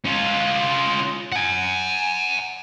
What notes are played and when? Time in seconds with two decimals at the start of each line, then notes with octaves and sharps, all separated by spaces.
0.06 C#4 F4
1.32 F#5 G#5